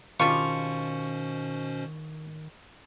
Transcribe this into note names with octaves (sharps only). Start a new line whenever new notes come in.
B2 D#3 G3 C#4 D4 F4 C5 C#6